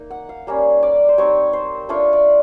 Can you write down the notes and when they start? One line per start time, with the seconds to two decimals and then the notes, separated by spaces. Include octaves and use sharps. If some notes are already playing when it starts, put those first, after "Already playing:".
Already playing: A#3 D#4
0.10 F#5
0.29 F5
0.47 G3 A#3 C#4
0.83 D5
1.09 C5
1.18 G3 C4 D#4 C#5
1.53 C5
1.89 A3 D4 F4 C#5
2.13 D5